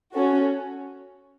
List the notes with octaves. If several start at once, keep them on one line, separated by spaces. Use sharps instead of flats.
C#4 F#4 A4